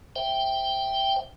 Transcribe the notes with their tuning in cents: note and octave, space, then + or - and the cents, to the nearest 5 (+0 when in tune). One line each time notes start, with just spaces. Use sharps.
C5 +0 E5 +0 G5 +0